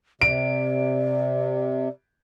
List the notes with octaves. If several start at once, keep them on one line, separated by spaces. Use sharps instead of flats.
C3 D5 D7